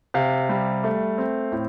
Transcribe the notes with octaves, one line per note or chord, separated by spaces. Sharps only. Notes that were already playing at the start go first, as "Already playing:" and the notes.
C3 F5
G3
A3
C4
A2